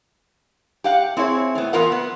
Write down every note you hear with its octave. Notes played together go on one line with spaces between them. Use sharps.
G4 F5 F#5
C4 E4 G#4 C#5
A2 B3
E2 B3 F4 A#4 B4 F#5
B3